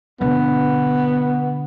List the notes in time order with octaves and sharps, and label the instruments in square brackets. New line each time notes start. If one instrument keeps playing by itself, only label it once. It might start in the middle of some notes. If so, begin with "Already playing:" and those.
[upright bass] B2 D3 [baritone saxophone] B3